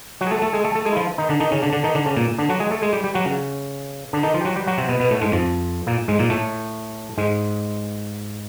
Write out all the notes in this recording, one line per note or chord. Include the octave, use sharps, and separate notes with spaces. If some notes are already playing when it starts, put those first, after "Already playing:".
F#3 F#4
G#4
A3 A4
A3 A4
G#3 G#4
A3 A4
A3 A4
G#3 G#4
E4
F3 F4
D#3 D#4
D3 D4
D#3 D#4
C#3 C#4
D3 D4
D3 D4
D#3 D#4
D3 D4
C#3 C#4
A#2 A#3
D3 D4
F#3 F#4
G#3 G#4
A3 A4
G#3 G#4
G3 G4
G3 G4
F#3 F#4
C#3 C#4
D3 D4
D#3 D#4
F3 F4
G4
F#3 F#4
G3 G4
F#3 F#4
C3 C4
B2 B3
B2 B3
A2 A3
G#2 G#3
F2 F3
A#2 A#3
G#2 G#3
A#2 A#3
A2 A3
G#2 G#3